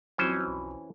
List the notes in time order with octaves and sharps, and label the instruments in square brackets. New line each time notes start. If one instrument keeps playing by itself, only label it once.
[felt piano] F2 F#3 [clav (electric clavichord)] E3 C#4 C5
[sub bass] B1